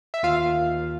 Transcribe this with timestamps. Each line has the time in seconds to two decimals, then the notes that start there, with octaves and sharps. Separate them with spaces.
0.14 E5
0.23 D#2 F4 F5
0.45 D#2
0.66 D#2